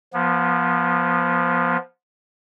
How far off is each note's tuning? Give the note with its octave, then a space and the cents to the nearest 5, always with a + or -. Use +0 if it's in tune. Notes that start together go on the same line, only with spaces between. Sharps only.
F3 +0 B3 -25